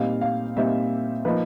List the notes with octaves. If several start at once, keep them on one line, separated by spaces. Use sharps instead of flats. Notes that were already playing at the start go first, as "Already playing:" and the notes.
Already playing: A#2 G3 C4 D#4 F5
F5
A#2 G3 C4 D#4 E5
F3 A#3 D#4 B4